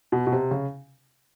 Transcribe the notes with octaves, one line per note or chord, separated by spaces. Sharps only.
B2
B2
C3
C#3